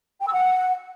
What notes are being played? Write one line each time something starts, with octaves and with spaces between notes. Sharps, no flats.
G5
E6
F#5